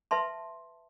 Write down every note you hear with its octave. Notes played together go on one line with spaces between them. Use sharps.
B4 E5 A5 C6